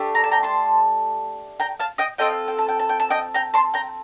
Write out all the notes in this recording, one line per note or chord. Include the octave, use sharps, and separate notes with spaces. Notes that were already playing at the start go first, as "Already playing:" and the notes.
Already playing: A3 D4 G4
A#5
A5
G5 A#5
A5 C6
G5 A#5
F5 A5
D#5 G5
C4 F4 A4 D#5 G5
G5
A5
G5
A5
G5
A5
D#5 G5
G5 A#5
A5 C6
G5 A#5